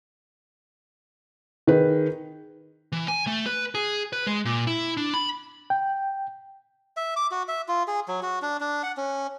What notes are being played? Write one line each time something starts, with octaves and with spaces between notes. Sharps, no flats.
D#3 G#4 B4
E3
G#5
A3
B4
G#4
B4
G#3
A#2
E4
D4
B5
G5
E5
D6
F#4
E5
F4
G#4
F#3
F#4
D4
D4
F#5
C#4